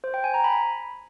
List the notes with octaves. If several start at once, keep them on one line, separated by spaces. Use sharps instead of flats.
C5
G5
G#5
A#5
B5